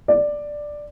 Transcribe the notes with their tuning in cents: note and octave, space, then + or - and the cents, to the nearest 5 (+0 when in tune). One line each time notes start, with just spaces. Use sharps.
D5 +5